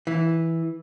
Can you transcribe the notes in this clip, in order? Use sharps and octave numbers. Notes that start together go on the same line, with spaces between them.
E3